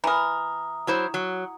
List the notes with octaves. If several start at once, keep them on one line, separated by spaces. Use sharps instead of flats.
E3 A#4 A#5 D#6
F#3 E4 C5
F#3